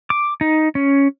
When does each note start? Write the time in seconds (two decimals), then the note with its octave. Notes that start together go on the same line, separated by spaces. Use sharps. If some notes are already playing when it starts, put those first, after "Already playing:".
0.10 D6
0.41 D#4
0.75 C#4